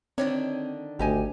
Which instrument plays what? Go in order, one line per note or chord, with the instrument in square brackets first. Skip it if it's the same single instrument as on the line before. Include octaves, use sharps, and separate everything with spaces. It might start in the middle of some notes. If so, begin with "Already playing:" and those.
[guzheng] D3 D#3 D4 [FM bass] C4 [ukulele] C#5
[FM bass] G#1 [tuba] D2 [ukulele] G4 D#5 G#5